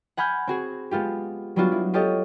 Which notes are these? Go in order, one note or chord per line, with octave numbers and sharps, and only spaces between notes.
F#5 G#5 B5 F6 G6
C4 F#4 G#4
G#3 B3 F4 G4
F#3 G3 B3 D4 F4 F#4
E4
F4 G4 A4 C#5 D#5